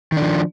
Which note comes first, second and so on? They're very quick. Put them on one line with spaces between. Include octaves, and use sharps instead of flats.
D#3 D4 F3